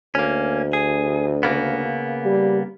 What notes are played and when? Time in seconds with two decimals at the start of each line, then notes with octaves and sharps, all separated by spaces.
0.15 D2 A#3 C#4
0.73 G#4
1.43 C#3 A#3 B3
2.25 G3